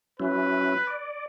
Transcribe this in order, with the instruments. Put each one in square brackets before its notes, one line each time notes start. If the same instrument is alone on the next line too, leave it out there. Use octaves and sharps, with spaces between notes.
[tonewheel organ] F#3 C#4 E4 [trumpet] B4
[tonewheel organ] D5